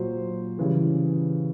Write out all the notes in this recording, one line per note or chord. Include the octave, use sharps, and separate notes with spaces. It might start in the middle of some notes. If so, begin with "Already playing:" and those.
Already playing: A#2 F#3 C5
C#3 E3 G3